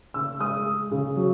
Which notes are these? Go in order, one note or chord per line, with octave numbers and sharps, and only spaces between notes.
C#3 E6
G#3 D#6
G#3
C#3
F#3